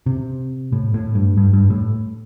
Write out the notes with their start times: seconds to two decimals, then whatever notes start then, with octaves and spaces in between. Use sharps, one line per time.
0.06 C3
0.72 A2
0.94 A2
1.15 G2
1.37 G2
1.53 G2
1.70 A2